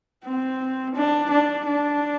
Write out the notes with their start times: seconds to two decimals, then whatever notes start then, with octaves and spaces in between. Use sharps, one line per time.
0.25 C4
0.95 D4
1.30 D4
1.66 D4